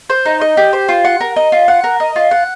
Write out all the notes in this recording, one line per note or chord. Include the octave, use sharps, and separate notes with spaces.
C5
D#4
D#5
G4
C5
F4
F#5
A#4
D#5
F4
F#5
A#4
D#5
F4
F#5